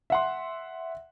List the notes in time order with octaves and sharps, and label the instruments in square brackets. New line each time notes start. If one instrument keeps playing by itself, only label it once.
[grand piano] E5 F#5 C6